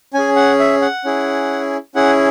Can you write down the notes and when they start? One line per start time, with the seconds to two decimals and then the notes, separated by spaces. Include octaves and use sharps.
0.14 C#4 G#4 G#5
0.36 F#5
0.59 E5
0.82 F#5
1.04 C#4 E4 G#4
1.95 C#4 E4 G#4 F#5